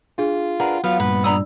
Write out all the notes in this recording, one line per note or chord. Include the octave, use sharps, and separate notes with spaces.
D4 F4 G#4
D4 G#4 A#4 B4 F#5
F#3 B3 F4 F5
G2 A#2 B4
D4 D5 A#5 B5 D#6 E6